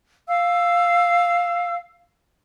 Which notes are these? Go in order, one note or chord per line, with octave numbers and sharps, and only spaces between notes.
F5 E6